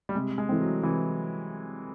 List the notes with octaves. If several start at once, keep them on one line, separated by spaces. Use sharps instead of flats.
G3
C3 G#3
G#3
E3 A3 C4
F#3
C3 E3